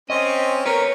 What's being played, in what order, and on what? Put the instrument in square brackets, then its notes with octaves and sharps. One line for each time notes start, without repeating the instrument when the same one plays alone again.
[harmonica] C4 C#4 [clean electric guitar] D#5
[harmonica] A#4 [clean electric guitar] B4 C#5